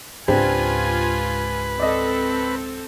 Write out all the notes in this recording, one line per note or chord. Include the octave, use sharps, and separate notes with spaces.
C#2 G#2 C4 D4 F4 G4 B4 G#5
C4 A4 D5 D#5